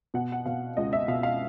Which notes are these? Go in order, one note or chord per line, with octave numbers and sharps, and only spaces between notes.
B2 F#5
F#5
B2 F5
C#2 D#5
E5
B2 F5
F5